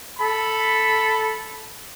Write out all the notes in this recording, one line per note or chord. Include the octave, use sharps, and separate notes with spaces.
A4 B5